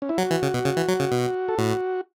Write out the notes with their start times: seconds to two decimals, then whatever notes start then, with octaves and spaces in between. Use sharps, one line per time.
0.02 C#4
0.09 E4
0.18 F#3 F#4
0.31 E3
0.42 C#3
0.54 B2
0.65 C#3
0.77 E3
0.88 F#3
1.00 C#3
1.12 B2
1.48 A4
1.58 A2 F#4